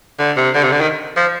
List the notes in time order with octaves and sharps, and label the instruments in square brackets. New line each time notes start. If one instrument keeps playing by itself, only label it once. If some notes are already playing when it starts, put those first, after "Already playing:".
[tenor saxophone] D3
C3
D3
C3
D3
D#3
F3